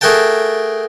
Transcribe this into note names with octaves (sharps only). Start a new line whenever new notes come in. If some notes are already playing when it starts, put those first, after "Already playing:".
A3 G#4 A#4 F#5 G5 A5